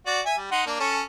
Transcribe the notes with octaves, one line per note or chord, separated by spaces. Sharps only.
F#4 D5
E5 G#5
G3
D#4 F#5 C6
A#3 D4
C#4 A4 C#5